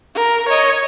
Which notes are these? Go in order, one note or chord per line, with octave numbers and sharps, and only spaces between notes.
A#4
C#5 D#5